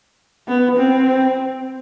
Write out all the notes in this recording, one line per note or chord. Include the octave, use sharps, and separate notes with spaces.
B3
C4